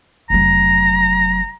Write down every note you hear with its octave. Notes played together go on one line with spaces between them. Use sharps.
F1 F#3 A#5